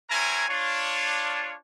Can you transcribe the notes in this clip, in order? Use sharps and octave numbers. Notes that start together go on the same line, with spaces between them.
C4 E4 A#4 C#5 G#5 A#5
D4 F4 C#5